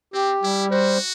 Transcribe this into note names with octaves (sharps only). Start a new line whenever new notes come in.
C4 G4
G3 E4
F#4 C5